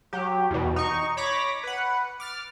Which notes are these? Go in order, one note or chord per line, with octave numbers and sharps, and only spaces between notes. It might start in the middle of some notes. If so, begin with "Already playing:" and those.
F#3 G4
E2 B2
D#4 C#6
C#5 B5 D6 A#6 B6
B4 F#5
D6 F6 A6